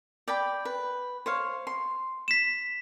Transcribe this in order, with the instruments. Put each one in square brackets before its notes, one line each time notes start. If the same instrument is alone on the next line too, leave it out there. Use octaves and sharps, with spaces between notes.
[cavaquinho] D5 G5 B5
B4
C5 C#5 F5
C6
[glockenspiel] B6 E7